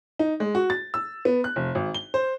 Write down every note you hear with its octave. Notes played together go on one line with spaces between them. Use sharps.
D#4
G#3
F#4
A6
E6
B3
F#6
F1
G#1
G7
C5